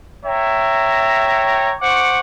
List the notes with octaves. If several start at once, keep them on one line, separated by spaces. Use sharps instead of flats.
C#5 E5 G5 A#5
C5 F#5 C#6 D6